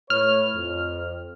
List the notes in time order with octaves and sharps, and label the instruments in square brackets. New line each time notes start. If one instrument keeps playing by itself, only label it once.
[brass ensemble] A2 B4 C#5 [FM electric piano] F6
[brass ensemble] F2